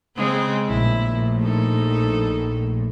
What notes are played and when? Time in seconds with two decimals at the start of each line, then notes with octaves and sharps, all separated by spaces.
0.17 C#3 G#3 C4
0.68 A#1 A2 E4
1.41 D#4 A4